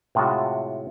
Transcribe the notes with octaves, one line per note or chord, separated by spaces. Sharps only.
A2 C3 G#3 F4 F#4